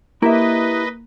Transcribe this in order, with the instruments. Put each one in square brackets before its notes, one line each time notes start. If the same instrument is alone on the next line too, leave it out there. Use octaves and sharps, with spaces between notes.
[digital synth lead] A#3 [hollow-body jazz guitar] E4 G4 E5 [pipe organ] B4 D#5